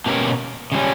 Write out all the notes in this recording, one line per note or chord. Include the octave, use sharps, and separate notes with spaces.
B2 A#3 C#4 G4 A#4
C#3 G3 C#4